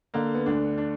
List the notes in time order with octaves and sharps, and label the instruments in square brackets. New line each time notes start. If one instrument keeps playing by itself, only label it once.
[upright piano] D3 [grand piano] A#3
[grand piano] B3
[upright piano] D2 [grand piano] D4
[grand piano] D4